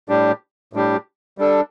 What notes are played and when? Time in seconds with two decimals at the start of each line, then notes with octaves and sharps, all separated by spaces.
0.09 A2 G3 D4 G4
0.73 A2 G3 D4 G4
1.38 G3 D4 A4